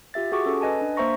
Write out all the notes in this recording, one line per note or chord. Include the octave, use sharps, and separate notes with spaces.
F4 G4 E5 A6
F#4 G#4 F#5 C#6 D6
C#4 A4
B4 D#5 G#5 A5
D4
A#3 C5 E5 A#5 C#6 A#6